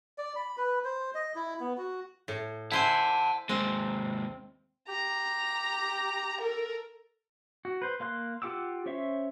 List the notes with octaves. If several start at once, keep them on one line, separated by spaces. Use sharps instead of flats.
D5
B5
B4
C5
D#5
E4
B3
F#4
A2
E4 C5 F#5 G#5 A5
D#2 G#3 C4
G4 A#5
A4 A#4
F#4
B4 C5
A#3 F5 C6 F#6
F4 G4 F#5 D6 E6
C#4 C5 C#5 E5